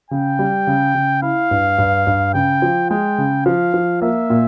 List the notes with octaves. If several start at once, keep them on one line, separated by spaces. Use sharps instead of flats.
C#3 G5
G3
C#3
C#3
E4 F5
G2
G2
G2
C#3 G5
F3
G#3 G5
C#3
F3 F5
F3
A#3 E5
A#2